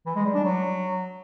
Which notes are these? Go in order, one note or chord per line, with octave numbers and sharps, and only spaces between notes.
E3
G#3
G3
D4
F#3